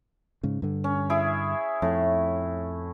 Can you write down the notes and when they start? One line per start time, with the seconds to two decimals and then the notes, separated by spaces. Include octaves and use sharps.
0.43 G#2 C#3
0.62 G2 D3
0.84 C#4
1.10 E4 G#4
1.82 F2 A2